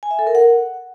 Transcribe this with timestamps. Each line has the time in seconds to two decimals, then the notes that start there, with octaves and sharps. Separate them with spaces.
0.03 G#5
0.11 E5
0.19 A4
0.27 A#4
0.35 F#5